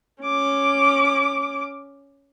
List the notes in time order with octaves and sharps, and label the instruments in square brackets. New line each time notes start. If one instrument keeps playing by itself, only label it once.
[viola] C#4 D6